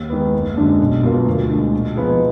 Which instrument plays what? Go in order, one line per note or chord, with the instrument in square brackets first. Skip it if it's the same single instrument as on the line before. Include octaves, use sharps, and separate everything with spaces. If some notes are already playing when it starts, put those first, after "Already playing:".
Already playing: [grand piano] D#2
D#3 G#3 B3
F#1
F#2 D3 G#3 D4
B1
B2 F#3 A#3 F4
D2
D3 G#3
A#2
F3 B3 D#4 G#4